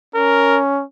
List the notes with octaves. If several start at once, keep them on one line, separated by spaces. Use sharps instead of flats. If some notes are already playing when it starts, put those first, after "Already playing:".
C#4 A#4